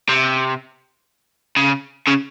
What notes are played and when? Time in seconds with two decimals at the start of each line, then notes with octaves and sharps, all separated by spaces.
0.09 C3
1.57 C#3
2.07 C#3